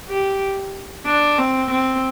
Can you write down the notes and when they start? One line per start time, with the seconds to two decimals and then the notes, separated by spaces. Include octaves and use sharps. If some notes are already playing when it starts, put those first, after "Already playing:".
0.09 G4
1.06 D4
1.39 C4
1.71 C4